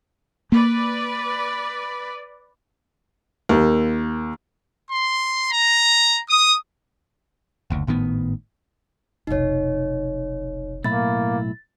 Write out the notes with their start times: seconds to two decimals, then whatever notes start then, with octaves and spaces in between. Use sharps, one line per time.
0.52 A#3 B4 D5
3.49 D#2 A#3
4.91 C6
5.51 A#5
6.29 D#6
7.70 F#1 D2
7.87 G#1 A2 D#3 B3
9.27 F1 B1 D#4 C#5
10.84 B1 A2 A#3 E4 A6